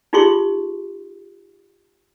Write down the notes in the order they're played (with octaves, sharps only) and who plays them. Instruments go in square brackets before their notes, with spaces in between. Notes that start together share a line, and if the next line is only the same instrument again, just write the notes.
[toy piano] D#4 F4 G4 G#4 C6 C#6